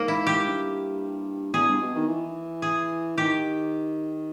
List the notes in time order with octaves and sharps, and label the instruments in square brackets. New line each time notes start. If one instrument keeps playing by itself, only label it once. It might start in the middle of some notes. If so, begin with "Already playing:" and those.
Already playing: [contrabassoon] G#2 [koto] A#3
[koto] E4
G4
[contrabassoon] G2
[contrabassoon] E2 [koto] G#4
[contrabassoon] G2
B2
D#3
E3
[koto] G#4
[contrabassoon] D#3 [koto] G4